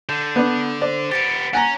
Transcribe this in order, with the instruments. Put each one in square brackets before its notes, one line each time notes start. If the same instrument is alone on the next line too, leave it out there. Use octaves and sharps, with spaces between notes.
[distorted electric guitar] D3 [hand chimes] G6
[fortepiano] B3 D4
[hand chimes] C5 [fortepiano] D5
[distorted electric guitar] B3 G4 [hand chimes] A6 C#7 D7
[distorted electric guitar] C#4 [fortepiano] F#5 G#5 A#5